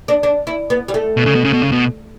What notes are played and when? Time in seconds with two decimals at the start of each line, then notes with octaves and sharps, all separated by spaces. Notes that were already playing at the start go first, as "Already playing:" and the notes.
0.08 D4
0.23 D4
0.47 E4
0.70 B3
0.88 G3
0.94 A3
1.17 B2
1.26 C#3
1.35 B2
1.44 C#3
1.53 B2
1.63 C#3
1.72 B2